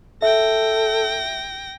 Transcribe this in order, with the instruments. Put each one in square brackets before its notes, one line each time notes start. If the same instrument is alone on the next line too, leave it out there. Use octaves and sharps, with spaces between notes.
[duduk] A4 [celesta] E5 [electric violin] G5 A#6